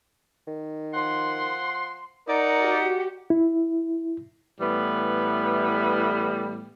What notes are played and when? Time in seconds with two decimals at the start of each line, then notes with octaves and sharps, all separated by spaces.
0.47 D#3
0.94 F3 F#5 C6
2.28 D#4 A#4 D5 F#5
2.61 F#4 G4
3.30 E4
4.59 A2 E3 G3 B3